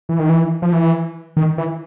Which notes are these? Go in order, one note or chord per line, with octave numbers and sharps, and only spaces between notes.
E3
D#3
E3
F3
E3
D#3
E3